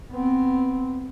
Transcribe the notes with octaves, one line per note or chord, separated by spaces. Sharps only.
B3 C4